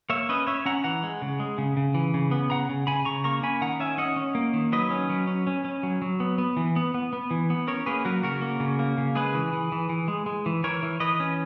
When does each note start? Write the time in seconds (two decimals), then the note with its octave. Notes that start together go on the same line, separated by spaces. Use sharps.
0.10 A#3 C#5 E5
0.29 C#4 B4 D#5
0.47 C#4 C#5 E5
0.66 C#4 F#5 A#5
0.84 E3 F#5 A#5
1.03 G#3
1.22 C#3
1.40 G#3
1.58 C#3
1.77 C#3
1.94 E3
2.14 C#3
2.31 B3
2.50 C#3 F#5 A#5
2.69 C#3
2.87 C#3 G#5 B5
3.05 C#3 A#5 C#6
3.24 A#3 A#5 C#6
3.42 C#4 G#5 B5
3.62 D#3 F#5 A#5
3.80 C#4 E5 G#5
3.98 C#4 D#5 F#5
4.16 C#4
4.35 A#3
4.54 D#3
4.72 F#3 B4 D#5
4.91 C#4
5.10 F#3
5.27 C#4
5.47 C#4
5.65 C#4
5.83 F#3
6.02 F#3
6.20 B3
6.38 B3
6.57 E3
6.76 B3
6.94 B3
7.13 B3
7.31 E3
7.50 B3
7.67 C#4 A#4 C#5
7.86 A#3 G#4 B4
8.05 F#3 F#4 A#4
8.23 C#3 F#4 A#4
8.41 A#3
8.60 C#3
8.79 A#3
8.98 C#3
9.15 G#3 G#4 B4
9.34 E3
9.53 E3
9.72 E3
9.89 E3
10.08 G#3
10.26 G#3
10.46 E3
10.64 E3 A#4 C#5
10.83 E3
11.00 E3 B4 D#5
11.20 C#4